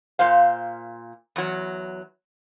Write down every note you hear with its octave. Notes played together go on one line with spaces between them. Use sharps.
A#2 C5 F5
E2 F#3